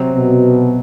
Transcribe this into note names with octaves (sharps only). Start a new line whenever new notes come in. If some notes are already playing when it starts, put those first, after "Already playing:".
Already playing: C3 F#3 C4
B2